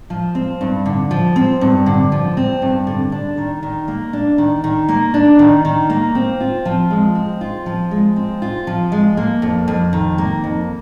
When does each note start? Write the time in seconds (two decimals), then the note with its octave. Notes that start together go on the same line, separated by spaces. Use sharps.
0.10 F3
0.35 C4
0.61 G2
0.86 D3
1.11 F3
1.36 C4
1.61 G2
1.86 D3
2.12 F3
2.37 C4
2.62 G2
2.87 D3
3.12 D4
3.38 D#3
3.63 D#3
3.88 A#3
4.13 D4
4.38 D#3
4.64 D#3
4.89 A#3
5.14 D4
5.39 D#3
5.65 D#3
5.90 A#3
6.15 C4
6.40 F4
6.65 F3
6.91 G#3
7.15 C4
7.41 F4
7.66 F3
7.91 G#3
8.16 C4
8.42 F4
8.67 F3
8.92 G#3
9.17 A#3
9.42 F2
9.68 F2
9.93 D#3
10.18 A#3
10.44 F2